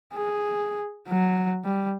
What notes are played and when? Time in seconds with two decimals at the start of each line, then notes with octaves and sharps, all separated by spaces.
0.13 G#4
1.09 F#3
1.64 G3